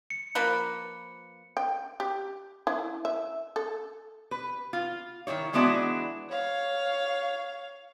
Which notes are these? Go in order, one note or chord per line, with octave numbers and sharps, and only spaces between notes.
C#7
F3 A#3 B4
G5
G4
E4
E5
A4
B4
F4
D#3 E3 E4 C#5
E3 G#3 B3 D4 E4 F#4
C#5 F5